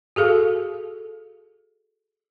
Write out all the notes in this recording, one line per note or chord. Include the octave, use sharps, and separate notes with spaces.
F#4 G#4 A4 F5